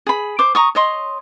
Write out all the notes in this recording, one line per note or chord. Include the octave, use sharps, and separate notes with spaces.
G#4 B5
C5 D6
A#5 C#6 D#6
C#5 D#5 C6